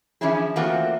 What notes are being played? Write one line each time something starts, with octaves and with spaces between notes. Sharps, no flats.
E3 F3 C#4 D4 E4 G#4
E3 A3 A#3 C4 F4 F#4